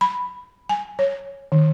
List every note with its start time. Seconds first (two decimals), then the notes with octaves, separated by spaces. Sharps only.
0.01 B5
0.69 G#5
0.99 C#5
1.52 D#3